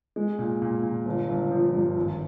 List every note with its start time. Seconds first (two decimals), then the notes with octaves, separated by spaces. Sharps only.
0.16 G#3
0.39 A#2
0.62 A#2
0.83 A#2
1.06 G1
1.29 G1
1.51 F3
1.74 G2
1.97 G#1